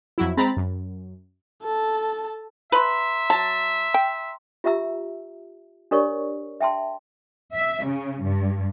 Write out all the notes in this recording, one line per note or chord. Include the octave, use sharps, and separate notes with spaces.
F2 F#3 E4
G#3 C4 A#5 B5 A6
F#2
A4 A5
B4 E5 A#5 C6
F#3 A5
G5
F4 G4 E5 A#5 E6
D4 G4 A#4 C#5 D5 C#6
E5 G5 A5 C6
E5
C#3
G2